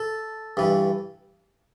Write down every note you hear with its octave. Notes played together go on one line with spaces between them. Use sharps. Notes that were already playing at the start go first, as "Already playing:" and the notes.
Already playing: A4
G2 E3